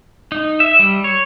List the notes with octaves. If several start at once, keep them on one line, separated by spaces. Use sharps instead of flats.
D#4
E5
G3
C#5